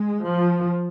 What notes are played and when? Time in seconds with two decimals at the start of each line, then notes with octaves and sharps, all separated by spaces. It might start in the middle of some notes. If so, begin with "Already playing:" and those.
Already playing: G#3
0.25 F3